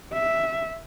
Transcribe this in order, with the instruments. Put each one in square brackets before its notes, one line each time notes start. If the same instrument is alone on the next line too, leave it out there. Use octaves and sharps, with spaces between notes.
[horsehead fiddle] E5